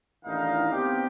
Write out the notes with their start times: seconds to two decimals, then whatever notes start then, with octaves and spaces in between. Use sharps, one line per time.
0.24 A1 A2 D#3 D4 D#4 F5
0.71 B3 C4 G4